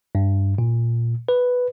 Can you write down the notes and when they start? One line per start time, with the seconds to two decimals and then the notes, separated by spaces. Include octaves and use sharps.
0.15 G2
0.58 A#2
1.29 B4